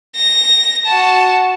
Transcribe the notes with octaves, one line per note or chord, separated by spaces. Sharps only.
A#6
F#4 A5